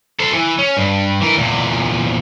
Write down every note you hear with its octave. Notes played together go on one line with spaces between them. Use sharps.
A4 C5
E3
C#4
G2
E3 A#4
E2 A#2